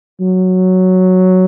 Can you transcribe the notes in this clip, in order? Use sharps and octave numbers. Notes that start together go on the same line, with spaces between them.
F#3